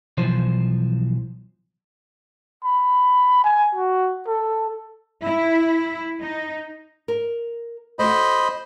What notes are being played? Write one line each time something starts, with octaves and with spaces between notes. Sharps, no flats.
B1 E3 F3 C5
B5
G#5
F#4
A4
E4
D#4
A#4
A3 F#4 C5 D#5 B5